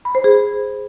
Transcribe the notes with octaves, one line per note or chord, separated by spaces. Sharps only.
B5
C5
G#4